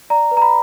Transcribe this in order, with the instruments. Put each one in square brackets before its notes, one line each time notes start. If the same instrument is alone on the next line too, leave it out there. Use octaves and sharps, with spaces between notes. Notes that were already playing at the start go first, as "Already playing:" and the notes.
[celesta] D5 A#5
B4
A#5
B5